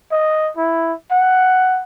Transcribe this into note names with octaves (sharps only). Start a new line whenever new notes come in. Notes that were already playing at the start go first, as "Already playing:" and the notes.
D#5
E4
F#5